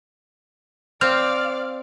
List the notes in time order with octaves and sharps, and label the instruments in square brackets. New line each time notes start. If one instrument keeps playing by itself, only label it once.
[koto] C4 [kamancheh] D5 F5 [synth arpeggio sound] F6